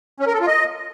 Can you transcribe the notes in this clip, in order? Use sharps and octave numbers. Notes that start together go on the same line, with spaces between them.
C#4
A#4
A4
F4
D#5